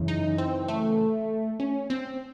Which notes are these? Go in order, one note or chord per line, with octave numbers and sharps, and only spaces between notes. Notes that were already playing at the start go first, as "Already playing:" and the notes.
Already playing: F#2 C#3 E3
D#4
C4
A3
C#4
C4